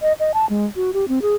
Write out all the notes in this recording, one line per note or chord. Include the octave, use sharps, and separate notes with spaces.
D#5
D#5
A5
G#3
F#4
G4
C4
G#4